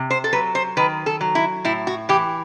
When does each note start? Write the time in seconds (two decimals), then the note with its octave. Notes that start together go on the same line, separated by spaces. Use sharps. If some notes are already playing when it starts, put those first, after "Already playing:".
Already playing: C3
0.11 C5
0.24 A4
0.33 F#3 B4
0.55 C5
0.77 D#3 B4
1.06 A4
1.21 F#3
1.35 E4
1.65 A2 E4
1.87 F#4
2.09 E3 G4